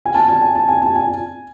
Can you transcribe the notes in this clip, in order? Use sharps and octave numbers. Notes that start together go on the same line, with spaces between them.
G#5
A5
A5
G#5
A5
G#5
A5
G#5